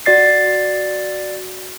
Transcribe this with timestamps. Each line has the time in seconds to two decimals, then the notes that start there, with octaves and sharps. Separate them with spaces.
0.06 F#4 D5 A6 C7